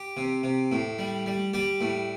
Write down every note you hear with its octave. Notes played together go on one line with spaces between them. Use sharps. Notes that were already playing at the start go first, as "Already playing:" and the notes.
Already playing: G4
C3
C3
A2
G3
G3
G3 G4
A2